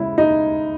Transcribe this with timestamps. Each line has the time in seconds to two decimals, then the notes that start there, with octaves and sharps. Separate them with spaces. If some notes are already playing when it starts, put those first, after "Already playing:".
Already playing: C#3 G#3 E4
0.18 D#4